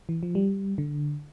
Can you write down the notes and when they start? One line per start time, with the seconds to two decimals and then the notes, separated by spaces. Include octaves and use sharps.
0.09 E3
0.23 F3
0.35 G3
0.78 D3